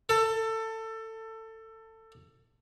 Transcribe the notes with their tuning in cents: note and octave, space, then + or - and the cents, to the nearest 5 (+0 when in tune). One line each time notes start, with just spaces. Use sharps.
A4 +20